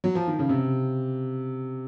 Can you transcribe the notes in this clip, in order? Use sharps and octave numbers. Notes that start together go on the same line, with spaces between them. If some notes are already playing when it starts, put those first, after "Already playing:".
F#3
F3
D#3
C#3
C3